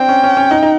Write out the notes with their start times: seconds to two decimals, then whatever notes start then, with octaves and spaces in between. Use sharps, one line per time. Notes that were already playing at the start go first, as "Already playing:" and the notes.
Already playing: C4 D4 G5
0.09 C#4
0.24 C#4
0.37 C#4
0.51 D#4
0.62 D#4